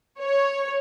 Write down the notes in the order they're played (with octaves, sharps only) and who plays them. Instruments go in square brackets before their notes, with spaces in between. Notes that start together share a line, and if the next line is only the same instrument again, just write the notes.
[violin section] C#5